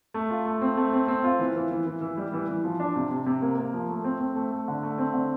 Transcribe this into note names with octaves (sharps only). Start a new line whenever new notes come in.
A3
F4
A3
C4
A3
C4
C4
F4
E3
E3
E3
E3
E3
G3
E3
E3
F3
D4
C3
C3
C3
A#3
A#3
F3
A3
C4
C4
A3
A3
D3
A3
C4
D3